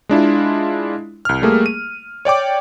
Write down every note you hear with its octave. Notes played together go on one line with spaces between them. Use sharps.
G#3 D4 E4 F4
C2 F6
G3 A3 A#3 G#4
D#7
C#5 D5 G5 D6